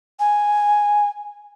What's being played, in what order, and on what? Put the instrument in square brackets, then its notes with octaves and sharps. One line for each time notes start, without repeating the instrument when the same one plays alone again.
[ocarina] G#5